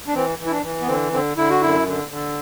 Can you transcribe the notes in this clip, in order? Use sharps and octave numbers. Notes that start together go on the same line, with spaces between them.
D4
E3 C4
E3
E4
D4
E3
B3
D3 C4
D3 C4
D3 E4
F#4
F#2 E4
D3
D3